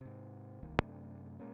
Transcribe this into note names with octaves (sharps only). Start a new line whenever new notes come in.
G#2 C3
D1 C2 D#3 A#3
F#2 C3 A3 D4
A#2 G#3 A#3 C#4